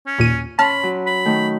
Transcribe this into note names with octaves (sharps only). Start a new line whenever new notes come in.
C#4
D#2 A#2 D#7
C#4 A5 B5 C6 F6
F#3
B5
D#3 A3